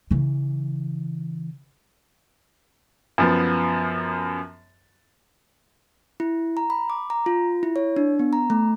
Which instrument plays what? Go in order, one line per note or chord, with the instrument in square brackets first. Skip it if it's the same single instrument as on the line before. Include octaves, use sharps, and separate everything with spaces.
[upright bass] C#3 E3
[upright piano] F#2 F3 B3
[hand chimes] E4
A#5
B5
D6
A#5
F4
E4
C#5
D4
B3
A#5
A3